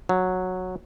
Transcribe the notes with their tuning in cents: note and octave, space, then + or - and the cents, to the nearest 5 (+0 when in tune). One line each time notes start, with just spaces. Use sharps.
F#3 -10